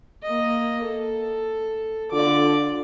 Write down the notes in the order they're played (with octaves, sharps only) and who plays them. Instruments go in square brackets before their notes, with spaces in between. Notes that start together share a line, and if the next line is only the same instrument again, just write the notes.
[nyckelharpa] A#3 D#5
A4
[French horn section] D3 F4 A4 [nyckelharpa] D5 D6